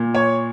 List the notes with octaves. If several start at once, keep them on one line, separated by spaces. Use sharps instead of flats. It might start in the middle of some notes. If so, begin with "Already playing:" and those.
Already playing: A#2
C#5